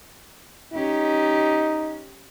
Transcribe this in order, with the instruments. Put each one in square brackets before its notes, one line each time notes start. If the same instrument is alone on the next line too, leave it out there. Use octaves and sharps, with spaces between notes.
[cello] C#4 G4 [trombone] D#4